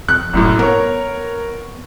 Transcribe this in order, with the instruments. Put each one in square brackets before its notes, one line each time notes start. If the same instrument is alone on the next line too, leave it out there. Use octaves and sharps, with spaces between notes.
[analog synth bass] F2 [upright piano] F#6
[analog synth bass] F1 [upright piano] C2 F#2 A2
[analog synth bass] B3 [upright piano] A#4 C#5